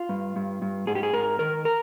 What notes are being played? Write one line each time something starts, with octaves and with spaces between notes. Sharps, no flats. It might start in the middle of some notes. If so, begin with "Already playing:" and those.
Already playing: F4
G2
G2
G2
G#2 G#4
G4
G#4
G#2 A#4
D#3 A#4
A#4